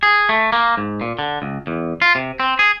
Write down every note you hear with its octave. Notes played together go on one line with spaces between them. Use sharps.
G#4
A3
A#3
G#2
A#2
D3
C#2
E2
F4
C3
C4
G#4